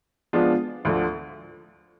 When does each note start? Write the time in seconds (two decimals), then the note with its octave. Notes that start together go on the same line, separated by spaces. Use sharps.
0.33 F3 G#3 B3 D4 F4
0.85 D2 D3 F3